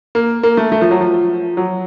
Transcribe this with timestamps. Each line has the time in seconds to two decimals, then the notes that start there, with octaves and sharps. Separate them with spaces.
0.15 A#3
0.43 A#3
0.57 A3
0.72 A3
0.81 F3
0.91 F#3
1.00 F3
1.57 F#3